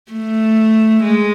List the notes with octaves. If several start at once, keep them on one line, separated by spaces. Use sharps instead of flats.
A3
G#3